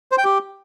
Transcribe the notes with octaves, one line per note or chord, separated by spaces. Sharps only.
C5
G5
G4